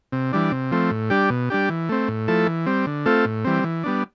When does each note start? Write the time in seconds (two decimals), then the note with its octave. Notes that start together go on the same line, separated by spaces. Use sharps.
0.12 C3
0.33 E3 G3 D4
0.52 C3
0.71 F3 A3 C4
0.91 A2
1.10 G3 D4 G4
1.30 B2
1.50 G3 D4 G4
1.70 E3
1.89 A3 C4
2.08 A2
2.28 F3 A3 E4 A4
2.47 E3
2.66 G3 C4
2.87 D3
3.06 A3 C4 F4 A4
3.25 A2
3.45 E3 G3 C4
3.64 E3
3.83 G3 B3 D4